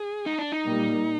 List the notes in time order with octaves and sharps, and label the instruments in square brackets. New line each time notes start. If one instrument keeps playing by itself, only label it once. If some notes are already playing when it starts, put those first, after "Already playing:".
Already playing: [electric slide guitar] G#4
D#4
D4
D#4
[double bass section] A#2 G3 A#3